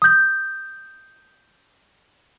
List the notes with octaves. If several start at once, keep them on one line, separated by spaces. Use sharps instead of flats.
D#6 G6